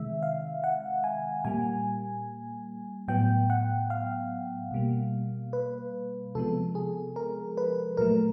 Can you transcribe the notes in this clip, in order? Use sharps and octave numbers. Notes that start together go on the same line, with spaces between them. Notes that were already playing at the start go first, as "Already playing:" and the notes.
Already playing: C3 D#3 G#3 E5
F5
F#5
G#5
A#2 G3 A#3 G#5
A2 F#3 B3 G5
F#5
F5
B2 G3 A#3
B4
C3 F3 G#3 B3 A4
G#4
A#4
B4
A#2 F#3 A3 A#4